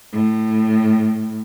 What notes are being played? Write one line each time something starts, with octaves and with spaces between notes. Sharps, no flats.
A2